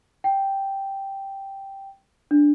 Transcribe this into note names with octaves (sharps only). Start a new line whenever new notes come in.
G5
D4